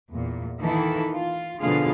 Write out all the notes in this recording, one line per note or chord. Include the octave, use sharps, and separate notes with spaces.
E2 A#2
D#3 E3 A#3 E4 A4
F4
B2 D3 F3 F4 G#4 F5